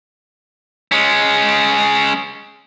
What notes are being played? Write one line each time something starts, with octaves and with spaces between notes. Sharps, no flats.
G#3 C#4